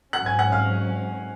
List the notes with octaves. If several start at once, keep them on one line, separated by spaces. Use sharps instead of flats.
G#2 F#3 C#4 F#5 F#6
G#5 G#6
F#5 F#6
F5 F6